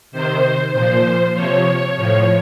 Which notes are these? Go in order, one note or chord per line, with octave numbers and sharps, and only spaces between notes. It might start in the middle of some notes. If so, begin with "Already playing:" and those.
C3 D#3 C5
A#2 F3 C5
C3 F3 C#5
A2 F3